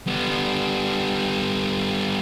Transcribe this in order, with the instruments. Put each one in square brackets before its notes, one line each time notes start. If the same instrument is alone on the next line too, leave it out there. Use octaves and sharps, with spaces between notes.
[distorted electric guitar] G3 B3